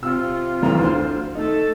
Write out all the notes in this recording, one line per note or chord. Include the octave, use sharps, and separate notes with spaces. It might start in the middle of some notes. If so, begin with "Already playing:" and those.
C3 F4 E6
B1 F2 E3 A#5
D2 D3 C5 C6
A3 D#4 A4